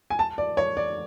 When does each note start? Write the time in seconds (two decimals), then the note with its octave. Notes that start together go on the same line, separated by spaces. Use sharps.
0.10 G#5
0.19 A5
0.38 D5
0.57 C#5
0.77 D5